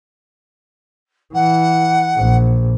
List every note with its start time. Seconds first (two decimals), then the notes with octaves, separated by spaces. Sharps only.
1.34 E3 F#5
2.16 A#1